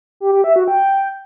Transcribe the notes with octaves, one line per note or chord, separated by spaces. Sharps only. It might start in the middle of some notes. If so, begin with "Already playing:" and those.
G4
G4
E5
F#4
G5